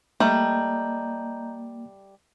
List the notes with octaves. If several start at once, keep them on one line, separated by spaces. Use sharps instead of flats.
G3 A3 A#3 D#5 A#5 G6